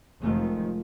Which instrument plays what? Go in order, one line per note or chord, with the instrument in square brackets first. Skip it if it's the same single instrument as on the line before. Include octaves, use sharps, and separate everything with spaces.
[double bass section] F1 D#3 F3 [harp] G#3 A3 F4